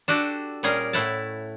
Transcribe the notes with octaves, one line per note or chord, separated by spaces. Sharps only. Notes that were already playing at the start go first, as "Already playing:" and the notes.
D4 F#4 G4 A4
A#2 G3 C#4 G#4 A#4
A2 A3 E4 F#5 A5